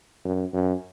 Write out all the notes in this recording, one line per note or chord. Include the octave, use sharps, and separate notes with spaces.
F#2
F#2